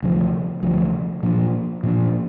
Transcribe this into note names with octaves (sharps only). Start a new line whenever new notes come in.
D2 C3 F3
D2 C3 F3
A#2 F3 A#3 D4
A#2 F3 A#3 D4